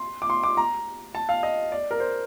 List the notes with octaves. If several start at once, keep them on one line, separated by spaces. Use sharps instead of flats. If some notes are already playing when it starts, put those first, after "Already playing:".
Already playing: C6
D6
C6
D6
A#5
A5
F5
D#5
D5
A#4
C5